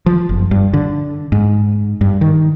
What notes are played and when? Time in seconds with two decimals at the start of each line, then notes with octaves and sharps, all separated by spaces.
0.06 F3
0.29 F#1
0.51 G2
0.74 D3
1.32 G#2
2.01 G2
2.21 D#3